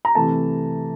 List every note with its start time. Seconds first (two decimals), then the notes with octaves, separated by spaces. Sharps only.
0.05 A#5
0.15 C3 E3 A3 A5